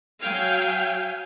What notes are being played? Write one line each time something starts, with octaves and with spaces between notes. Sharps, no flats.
F#3 F5 G5 G#5